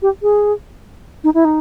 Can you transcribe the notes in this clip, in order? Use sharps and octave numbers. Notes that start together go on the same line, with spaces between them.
G4
G#4
D#4
E4
D#4